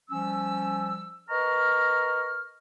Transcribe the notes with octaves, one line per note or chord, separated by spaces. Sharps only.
F3 G3 C#4 E6
A#4 B4 D#5 A#5 C#6 F6